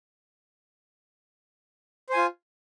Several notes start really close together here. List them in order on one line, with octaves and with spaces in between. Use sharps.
C5 G#5 F4